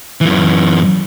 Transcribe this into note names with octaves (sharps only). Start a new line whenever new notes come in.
F#2 E3